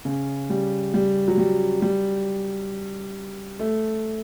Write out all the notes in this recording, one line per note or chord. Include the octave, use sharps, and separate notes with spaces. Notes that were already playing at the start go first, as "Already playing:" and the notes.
C#3
G3
G3
F#3
G3
G3
A3